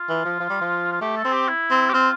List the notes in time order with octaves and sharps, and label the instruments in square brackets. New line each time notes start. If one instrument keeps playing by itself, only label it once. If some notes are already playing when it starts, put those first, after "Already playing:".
Already playing: [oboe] F4
[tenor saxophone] E3
F3
F3
G3
F3
[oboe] F4
[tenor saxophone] A3 [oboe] G4
[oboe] A4
[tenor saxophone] C4
[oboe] G4
E4
[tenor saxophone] C4
[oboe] G4
[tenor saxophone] C4 [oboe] F4